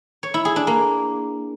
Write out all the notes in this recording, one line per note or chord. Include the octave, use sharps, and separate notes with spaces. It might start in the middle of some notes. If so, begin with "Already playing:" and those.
C#5
E4
G#4
D4
A#3